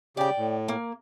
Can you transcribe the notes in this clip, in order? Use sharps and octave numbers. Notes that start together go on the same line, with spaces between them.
C#3 G4 D5 G5
A2
A#3